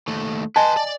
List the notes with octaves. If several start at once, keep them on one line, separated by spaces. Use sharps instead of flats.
D#2 A3
B4 D#5 G#5 A5 C6
D5